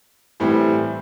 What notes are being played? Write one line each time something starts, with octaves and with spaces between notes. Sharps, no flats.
A2 E3 G3 C4